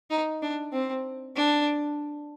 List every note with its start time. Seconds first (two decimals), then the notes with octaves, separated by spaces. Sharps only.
0.10 D#4
0.42 D4
0.73 C4
1.36 D4